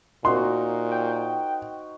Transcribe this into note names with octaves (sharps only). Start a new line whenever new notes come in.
A#2 D#4 F#4 C5 C6
G5